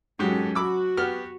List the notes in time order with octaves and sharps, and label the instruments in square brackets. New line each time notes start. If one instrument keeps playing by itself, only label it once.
[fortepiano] G#2 F#4 G4 [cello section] F#3 C#4 A4
[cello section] F#4 [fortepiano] B5 D6 E6
[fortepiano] B3 G4 F6